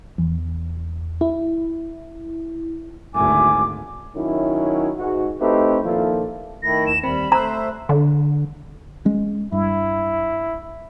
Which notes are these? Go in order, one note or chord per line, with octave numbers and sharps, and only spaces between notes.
E2
E4
G#1 D2 E4 G#5 D6
D#3 F#3 C#4 E4
G#2 F#4
A3 C4 D#4 E4 G4 B4
A#2 D#3 F3 A#3 E4 A4
D#3 A3 E4 A#6
D#2 E7
D#2 G3 C4 B5
A3 C5 E5 A#5 E6 F#6
D3
G#3 C#4
G2 E4